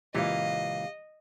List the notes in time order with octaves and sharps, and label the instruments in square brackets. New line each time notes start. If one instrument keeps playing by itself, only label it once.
[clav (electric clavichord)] C#2 A#2 E3 [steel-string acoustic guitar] G4 F5 [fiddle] D#5